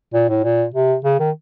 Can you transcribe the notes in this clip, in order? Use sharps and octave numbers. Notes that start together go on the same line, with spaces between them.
A#2
A2
A#2
C3
C#3
D#3